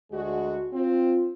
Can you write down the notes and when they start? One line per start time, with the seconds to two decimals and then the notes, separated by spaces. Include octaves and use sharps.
0.12 D2 G#3 F#4
0.73 C4 F4